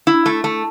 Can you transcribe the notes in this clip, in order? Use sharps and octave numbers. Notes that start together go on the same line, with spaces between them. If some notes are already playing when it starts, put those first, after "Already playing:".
E4
A3
A3